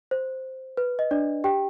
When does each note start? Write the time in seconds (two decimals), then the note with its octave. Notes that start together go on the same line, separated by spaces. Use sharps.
0.11 C5
0.77 B4
0.99 D#5
1.11 D4 D5
1.44 G4 G5